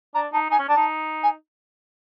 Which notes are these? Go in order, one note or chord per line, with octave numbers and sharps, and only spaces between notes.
D4 A#5
D#4 A5
D#4 G#5
C#4
D4 A5
D#4
G#5